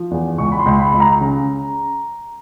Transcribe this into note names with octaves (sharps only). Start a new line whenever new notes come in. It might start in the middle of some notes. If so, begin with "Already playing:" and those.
Already playing: F3
E2
C#2 C#6
B5
C6
C#2
B5
C#2
A#5
C#3